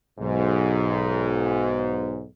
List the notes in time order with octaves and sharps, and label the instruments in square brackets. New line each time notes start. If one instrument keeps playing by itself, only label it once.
[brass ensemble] B1 G#2